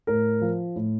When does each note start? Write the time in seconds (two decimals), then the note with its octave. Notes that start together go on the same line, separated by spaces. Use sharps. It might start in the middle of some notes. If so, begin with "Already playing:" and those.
0.07 A2 A#4
0.41 F3
0.76 A2